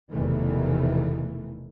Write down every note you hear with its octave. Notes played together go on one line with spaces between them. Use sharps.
F1 E2 B2 D#3 E3 A3